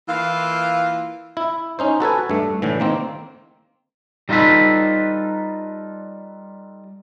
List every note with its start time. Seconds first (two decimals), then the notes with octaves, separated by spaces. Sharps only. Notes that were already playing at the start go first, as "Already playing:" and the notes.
0.09 E3 A#3 F4 F5
1.37 E4
1.79 C#4 D#4 C5
2.00 F#4 A4 B4 G#5
2.30 G2 A3
2.62 A2 D3 E3
2.80 D#3 A#3 C4
4.29 G3 D#4 F4 A4 B4